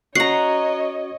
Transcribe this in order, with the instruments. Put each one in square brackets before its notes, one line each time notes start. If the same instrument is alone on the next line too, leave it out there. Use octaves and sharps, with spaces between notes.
[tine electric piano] C#4 F#4 C#6 [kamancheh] C#5 D#5 [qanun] F#5 A#5 [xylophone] C7